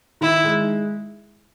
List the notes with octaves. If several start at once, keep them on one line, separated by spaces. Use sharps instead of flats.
D#3 E4
G#3